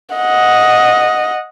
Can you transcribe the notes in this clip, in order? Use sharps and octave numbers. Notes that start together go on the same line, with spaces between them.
D#5 F#5